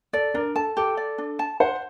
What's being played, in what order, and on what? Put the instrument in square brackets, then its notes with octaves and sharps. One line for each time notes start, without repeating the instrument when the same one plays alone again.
[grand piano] A4 [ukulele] D5
[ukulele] D4 [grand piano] A#4
[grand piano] A4 [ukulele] A5
[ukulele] G4 [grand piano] A4
[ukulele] D5
D4
A5
[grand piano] C5 [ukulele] F#5